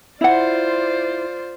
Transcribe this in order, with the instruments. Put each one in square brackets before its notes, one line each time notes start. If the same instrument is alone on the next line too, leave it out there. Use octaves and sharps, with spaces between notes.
[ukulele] E4 F#5 [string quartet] F4 C5 D5